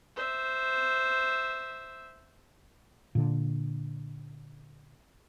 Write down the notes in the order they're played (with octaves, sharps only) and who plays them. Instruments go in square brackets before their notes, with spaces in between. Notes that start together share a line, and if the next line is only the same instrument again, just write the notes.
[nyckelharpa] C5 E5
[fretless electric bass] A#2 D3